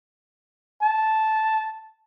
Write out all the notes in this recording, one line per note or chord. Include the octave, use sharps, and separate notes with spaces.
A5